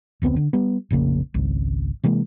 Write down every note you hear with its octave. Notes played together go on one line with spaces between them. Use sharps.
F1 D2 B3 C4
D3
G3 B3
F1 A#1 C#3 A#3
G#1 C#2
C3 E3 G#3 A#3